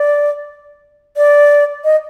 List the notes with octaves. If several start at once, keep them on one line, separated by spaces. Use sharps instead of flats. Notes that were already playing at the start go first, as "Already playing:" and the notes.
Already playing: D5
D5
D#5